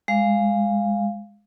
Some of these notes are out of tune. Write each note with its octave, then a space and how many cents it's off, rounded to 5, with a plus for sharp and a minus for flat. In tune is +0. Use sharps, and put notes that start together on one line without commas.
G#3 -15 F5 +0